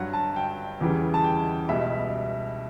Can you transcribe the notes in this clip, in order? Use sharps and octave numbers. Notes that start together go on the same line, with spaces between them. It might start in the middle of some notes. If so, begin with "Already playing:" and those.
Already playing: G2 F#3 F#5
A5
G5
E2 C#3 E3 G3
A5
G5
C#2 B2 G3 E5